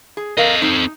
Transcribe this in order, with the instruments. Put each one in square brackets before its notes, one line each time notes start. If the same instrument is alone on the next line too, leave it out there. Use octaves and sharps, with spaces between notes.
[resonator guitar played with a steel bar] G#4
[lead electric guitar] A4 D#5 [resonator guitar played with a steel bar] A#4 F5
[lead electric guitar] C4 A4 [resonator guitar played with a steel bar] D#4